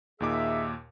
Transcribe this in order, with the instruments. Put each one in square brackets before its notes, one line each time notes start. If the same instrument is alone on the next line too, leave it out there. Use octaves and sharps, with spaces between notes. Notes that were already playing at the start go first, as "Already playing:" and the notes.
[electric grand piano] D#2 A#2 D6 [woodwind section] D#4 G#4 E5